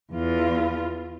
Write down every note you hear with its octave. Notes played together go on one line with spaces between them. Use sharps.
E2 F4